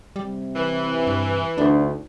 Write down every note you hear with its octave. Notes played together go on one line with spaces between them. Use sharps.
C3 G3
E3
G2
D2 D4 D#4